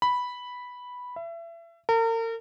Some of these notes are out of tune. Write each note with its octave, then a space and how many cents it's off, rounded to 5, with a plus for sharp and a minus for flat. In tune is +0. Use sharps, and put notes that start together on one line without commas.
B5 -5
E5 +30
A#4 -40